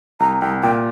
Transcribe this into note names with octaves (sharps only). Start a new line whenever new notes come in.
C2 A#5
C2 G5
A#2 G5